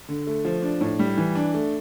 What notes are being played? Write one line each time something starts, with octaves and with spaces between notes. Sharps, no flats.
D3
A3
F3
D4
A2
G3
E3
D4
A3